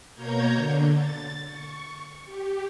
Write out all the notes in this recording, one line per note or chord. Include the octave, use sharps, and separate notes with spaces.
B2 A#3 C#5 A#5 G6 G#6
D3
A6
C#6
G4